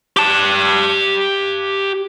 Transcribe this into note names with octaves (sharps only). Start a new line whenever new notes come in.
G4 A5